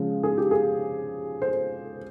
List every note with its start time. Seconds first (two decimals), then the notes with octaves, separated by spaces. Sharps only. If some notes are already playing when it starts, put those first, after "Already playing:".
Already playing: C#3 F3 G#3
0.23 G#4
0.38 G4
0.51 G#4
1.42 C5